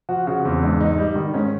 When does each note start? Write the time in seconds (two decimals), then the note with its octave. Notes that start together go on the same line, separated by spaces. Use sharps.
0.09 F3 F#4
0.26 C#3 F#4
0.44 E2 C4
0.63 G#2 D4
0.80 G#2 D#4
0.98 G3 D#4
1.15 D#3
1.34 G#2 C#4